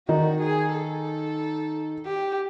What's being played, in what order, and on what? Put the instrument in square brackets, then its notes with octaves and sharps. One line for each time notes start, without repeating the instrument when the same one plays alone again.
[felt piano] D#3 D#4 [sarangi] F#4
[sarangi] G#4
A4
G4